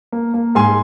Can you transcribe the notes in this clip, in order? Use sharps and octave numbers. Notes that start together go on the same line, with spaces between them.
A#3
A#3
G#2 G#5 C6